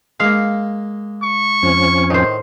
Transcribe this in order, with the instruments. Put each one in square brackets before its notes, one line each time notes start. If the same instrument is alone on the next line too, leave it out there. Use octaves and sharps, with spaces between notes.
[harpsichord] G#3 A#3 [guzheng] F5
[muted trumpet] C#6
[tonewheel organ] F2 F3 C#4
[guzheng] A2 C5 [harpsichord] D#3